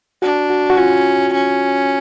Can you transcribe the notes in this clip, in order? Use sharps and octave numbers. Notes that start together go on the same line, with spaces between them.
D4 F#4
F#4
F#4
C#4 F4
C#4